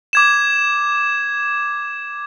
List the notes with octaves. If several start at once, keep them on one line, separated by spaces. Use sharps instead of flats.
D6 G#6 E7